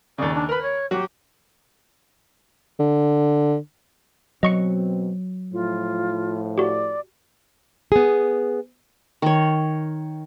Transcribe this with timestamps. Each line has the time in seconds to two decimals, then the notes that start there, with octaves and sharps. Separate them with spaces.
0.18 D#2 C#3 D5
0.34 D4
0.49 A#4 B4 B5
0.61 C#5
0.91 F#3 F#4 G4
2.79 D3
4.43 B2 F#3 C4 D#5 C#6 C#7
5.53 A2 F3 F4
6.58 F#4 G4 D5
7.92 B3 G#4
9.22 D#3 C#5